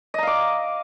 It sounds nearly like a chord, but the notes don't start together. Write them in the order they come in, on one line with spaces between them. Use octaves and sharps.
D#5 A#5 F5 D6